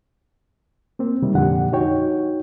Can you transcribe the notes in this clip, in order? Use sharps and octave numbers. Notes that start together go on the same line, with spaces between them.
A#3 C4
C3 D#3 G3
F2 A#2 D3 F3 G4 F#5
D#4 F#4 C#5 G5